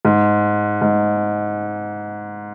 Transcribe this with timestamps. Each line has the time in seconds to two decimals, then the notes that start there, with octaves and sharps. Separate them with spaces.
0.05 G#2
0.81 G#2